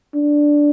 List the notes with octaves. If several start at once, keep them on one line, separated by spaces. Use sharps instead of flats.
D4